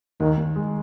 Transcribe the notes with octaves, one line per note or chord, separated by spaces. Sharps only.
D#2 D#3
D#2
G#3